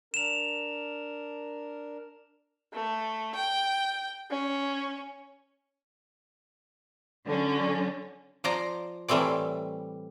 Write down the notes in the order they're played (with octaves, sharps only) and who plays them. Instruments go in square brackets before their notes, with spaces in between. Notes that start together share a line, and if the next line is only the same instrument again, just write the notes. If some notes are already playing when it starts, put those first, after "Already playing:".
[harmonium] D4 A#4 [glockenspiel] E7 F7
[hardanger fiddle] A3
G5
C#4
[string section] D3 F#3 C#4
[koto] F3 C5 D5 A#5
A2 E3 G3 A3 C4 D5